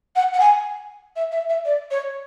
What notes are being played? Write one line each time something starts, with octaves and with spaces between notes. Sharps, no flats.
F#5
F#5
G#5
E5
E5
E5
D5
C#5